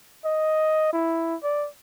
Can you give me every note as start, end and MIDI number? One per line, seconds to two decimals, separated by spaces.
0.25 0.90 75
0.93 1.36 64
1.43 1.67 74